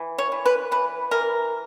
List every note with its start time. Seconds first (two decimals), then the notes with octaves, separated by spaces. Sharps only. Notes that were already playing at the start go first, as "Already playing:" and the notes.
Already playing: E3
0.18 C#5
0.32 E3
0.46 B4
0.71 E3 B4
1.11 E3 A#4